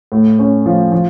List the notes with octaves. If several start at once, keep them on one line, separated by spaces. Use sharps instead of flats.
A2
C#4
F3
F3